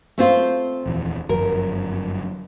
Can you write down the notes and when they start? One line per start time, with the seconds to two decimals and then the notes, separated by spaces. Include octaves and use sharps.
0.18 A3 C4 F4
0.86 D#1 F2 E3
1.29 G1 F#2 F3 A#4